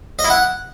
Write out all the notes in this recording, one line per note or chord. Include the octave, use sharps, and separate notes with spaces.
D#5
E4
F#5